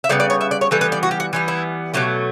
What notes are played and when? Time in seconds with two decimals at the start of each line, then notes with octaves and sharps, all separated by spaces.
0.04 E5
0.09 C#3 G3 B3 D5
0.20 D5
0.30 C#5
0.41 E5
0.51 D5
0.61 C#5
0.71 E3 G3 B3 A4
0.81 B4
0.92 D5
1.03 F#4
1.11 G4
1.20 F#4
1.33 E3 G3 B3
1.48 E4
1.94 B2 F#3 A3 G4